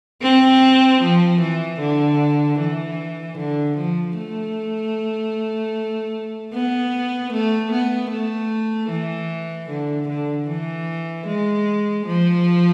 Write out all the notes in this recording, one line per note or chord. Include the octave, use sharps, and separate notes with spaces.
C4
F3
E3
D3
E3
D3
F3
A3
B3
A3
B3
A3
E3
D3
D3
E3
G#3
F3